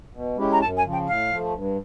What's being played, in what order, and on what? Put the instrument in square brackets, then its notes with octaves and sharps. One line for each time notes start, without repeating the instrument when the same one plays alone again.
[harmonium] B2
G#3 C#4 E4 G4
[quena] A#5
[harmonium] F#2 [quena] A5
[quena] G#5
[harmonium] C#3 F3
[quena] G5
[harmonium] A2 [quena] F5
[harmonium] F3 A3
G2